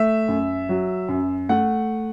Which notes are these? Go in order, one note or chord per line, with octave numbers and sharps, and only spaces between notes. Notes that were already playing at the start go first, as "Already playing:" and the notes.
Already playing: A3 E5
F#2
F#3
F#2
A3 F#5